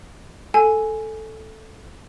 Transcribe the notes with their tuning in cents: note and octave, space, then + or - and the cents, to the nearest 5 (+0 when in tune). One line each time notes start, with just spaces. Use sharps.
A4 +0 G#5 +5